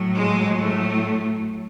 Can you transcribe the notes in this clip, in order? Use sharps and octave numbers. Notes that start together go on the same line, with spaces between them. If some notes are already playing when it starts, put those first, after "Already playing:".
Already playing: A2 F#3
G#3
A2 A3